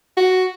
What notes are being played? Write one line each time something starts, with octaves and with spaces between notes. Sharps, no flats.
F#4